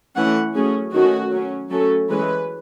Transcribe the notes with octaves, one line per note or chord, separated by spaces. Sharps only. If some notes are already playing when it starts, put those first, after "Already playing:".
E3 A3 C#4 F#5
F#3 A3 C#4 G#4
D#3 A3 C#4 F#4
F#3 C#4
F#3 A3 C#4 A4
E3 G#3 C#4 B4